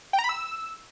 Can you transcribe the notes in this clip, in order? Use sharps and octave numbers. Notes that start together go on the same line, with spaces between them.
G5
A#5
B5
E6